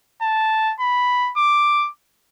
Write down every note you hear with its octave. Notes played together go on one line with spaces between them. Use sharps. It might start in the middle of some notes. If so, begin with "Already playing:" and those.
A5
B5
D6